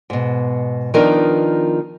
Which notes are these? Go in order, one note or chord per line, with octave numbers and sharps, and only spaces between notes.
G#2 B2
D#3 F3 B3 D4 D#4 A#4